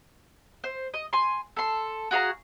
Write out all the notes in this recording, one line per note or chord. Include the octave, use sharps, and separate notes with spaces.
C5
D#5
G#5 C6
A4 C6
F#4 G#4 F5 A#5